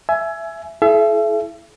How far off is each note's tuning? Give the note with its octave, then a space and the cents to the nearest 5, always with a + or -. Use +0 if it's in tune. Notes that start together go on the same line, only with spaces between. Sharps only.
E5 +15 G#5 +20
E4 +0 A4 -45 E5 +35